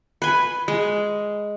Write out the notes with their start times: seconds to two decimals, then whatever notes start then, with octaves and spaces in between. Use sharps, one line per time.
0.22 B4 G#5
0.68 G#3